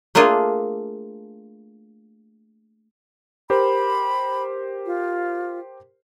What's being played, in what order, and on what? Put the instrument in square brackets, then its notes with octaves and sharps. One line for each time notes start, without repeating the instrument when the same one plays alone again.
[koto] A3 A#3 D4 F4 G#4
[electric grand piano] G4 A#4 C5 [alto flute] B5
[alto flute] F4